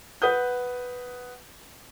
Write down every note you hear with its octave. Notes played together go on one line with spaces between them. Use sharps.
B4 F#5 D#6 G6